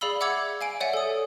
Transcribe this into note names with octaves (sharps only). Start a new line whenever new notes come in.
G#4 D5 F5 B5 E6 G7
E5 F#5 D6 E6 G#6 C#7
F5 G#5 D7
C#5 D5 E5 F#5 G#5
A4 D#6